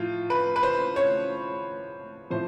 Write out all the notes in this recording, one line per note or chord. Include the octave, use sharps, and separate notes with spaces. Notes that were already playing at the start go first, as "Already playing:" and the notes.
Already playing: A2 F3 F4
B4
B4
C5
C#5
A2 F3 C5